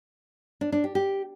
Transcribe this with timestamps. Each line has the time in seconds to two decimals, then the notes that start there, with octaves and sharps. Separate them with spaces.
0.61 D4
0.72 D4
0.84 G4
0.95 G4